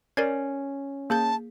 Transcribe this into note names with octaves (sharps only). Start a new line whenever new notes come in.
C#4 A#4 D5 G#6
A#3 G#4 A5 G6